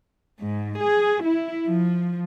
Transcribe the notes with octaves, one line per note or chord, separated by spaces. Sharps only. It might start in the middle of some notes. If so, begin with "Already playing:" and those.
G#2
G#4
E4
F3